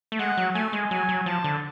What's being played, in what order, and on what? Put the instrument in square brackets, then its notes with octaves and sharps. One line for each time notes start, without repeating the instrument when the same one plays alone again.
[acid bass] A3
[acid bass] G#3 [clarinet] F#5
[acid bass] F#3
[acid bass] A3 [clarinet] G#5
[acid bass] G#3
[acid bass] F#3 [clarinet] G#5
[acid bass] F#3
[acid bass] F3 [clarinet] A5
[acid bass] D3